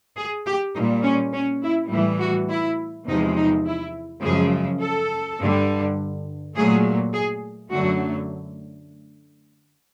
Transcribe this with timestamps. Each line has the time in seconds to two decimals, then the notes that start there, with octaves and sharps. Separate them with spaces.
0.16 G#4
0.45 G4
0.74 A#2 D#4
0.80 G3
1.03 C#4
1.33 C#4
1.62 E4
1.91 A2 E3 G3 E4
2.20 F#4
2.48 E4
3.07 E2 C3 F3 G#3 D#4
3.36 D#4
3.65 E4
4.22 F#2 C#3 F3 G#3 G#4
4.81 A4
5.39 G2 D3 G3
6.54 A#2 F#3 A3 G#4
7.13 G#4
7.71 F#2 D3 F#3 A3 F#4